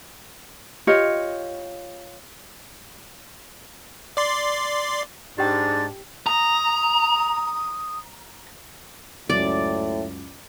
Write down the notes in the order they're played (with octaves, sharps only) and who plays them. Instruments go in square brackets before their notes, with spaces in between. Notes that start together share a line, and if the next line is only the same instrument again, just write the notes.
[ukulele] F4 G4 C#5 D#5
[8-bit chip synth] D5 C6
[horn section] G#2 [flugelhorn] D4 [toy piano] G4 G5 [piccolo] A6
[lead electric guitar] A#5 [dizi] D#6
[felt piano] C#2 F#2 [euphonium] A2 [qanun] D5